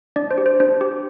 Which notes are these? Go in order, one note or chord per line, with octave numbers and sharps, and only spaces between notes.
D4 D5
C5
G4
C5
D4 C5
G4